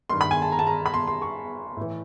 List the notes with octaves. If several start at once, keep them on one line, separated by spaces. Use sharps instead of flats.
G2 D#3 C6
B5
G#5
A5
A#5
A5
A#5
B5
C6
C6
C#6
A2 E3